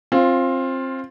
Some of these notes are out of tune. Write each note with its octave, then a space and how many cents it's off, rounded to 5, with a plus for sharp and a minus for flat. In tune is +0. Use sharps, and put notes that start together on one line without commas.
C4 +20 F4 +0